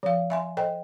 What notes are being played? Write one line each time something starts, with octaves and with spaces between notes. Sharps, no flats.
F3 F5
E5 G#5 C6
A4 C5 D#5 G5